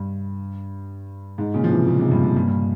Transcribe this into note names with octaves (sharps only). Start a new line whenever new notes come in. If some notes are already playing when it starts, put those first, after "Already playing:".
Already playing: G2
G#2
A#2 C#3
F3
C3 E3
A#2 C#3
G#2 C3
G2 A#2
G2
G2 A#2
G2